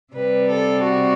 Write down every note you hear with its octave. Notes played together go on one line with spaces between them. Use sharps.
C3 G3 B4
A4
F#4